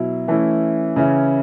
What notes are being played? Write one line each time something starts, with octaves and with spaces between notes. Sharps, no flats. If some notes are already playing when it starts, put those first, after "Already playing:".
Already playing: B2 F#3 E4
E3 A3 C#4 E4
C#3 E3 C#4 E4